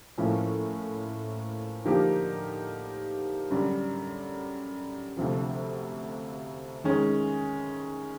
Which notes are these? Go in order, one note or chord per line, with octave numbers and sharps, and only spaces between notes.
A2 F3 A#3 C#4 E4
D3 F3 A#3 D#4 G4
F#2 D3 G3
D2 C3 F3
D#3 G#3 C#4